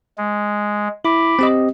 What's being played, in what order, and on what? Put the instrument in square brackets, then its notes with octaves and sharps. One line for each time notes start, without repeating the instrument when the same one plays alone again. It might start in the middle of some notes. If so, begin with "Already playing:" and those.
[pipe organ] G#3
[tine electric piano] E4 [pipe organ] B5 D6
[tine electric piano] C4 G4 D#5